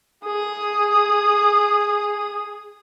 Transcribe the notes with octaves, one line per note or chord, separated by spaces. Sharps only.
G#4 D#6